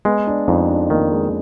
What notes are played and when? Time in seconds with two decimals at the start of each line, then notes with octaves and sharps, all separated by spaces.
0.05 G#3 B3
0.27 D4
0.48 F2 D#4
0.69 D4
0.90 D#3 A#3
1.12 G#3